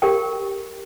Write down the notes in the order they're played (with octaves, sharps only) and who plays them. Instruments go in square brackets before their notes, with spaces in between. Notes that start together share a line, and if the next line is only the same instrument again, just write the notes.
[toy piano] G4 A#4 G5